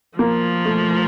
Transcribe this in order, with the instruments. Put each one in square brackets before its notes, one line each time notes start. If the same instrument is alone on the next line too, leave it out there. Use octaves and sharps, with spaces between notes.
[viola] F3 [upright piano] A#3
[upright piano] A3